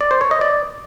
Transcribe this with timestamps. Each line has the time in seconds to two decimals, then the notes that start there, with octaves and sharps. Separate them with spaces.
0.01 D5
0.11 C5
0.21 C#5
0.31 D#5
0.41 D5